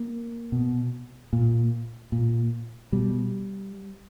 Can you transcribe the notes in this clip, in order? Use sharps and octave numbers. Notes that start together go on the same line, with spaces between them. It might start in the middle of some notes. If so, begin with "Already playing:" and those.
Already playing: A#3
B2
A#2
A#2
B2 G3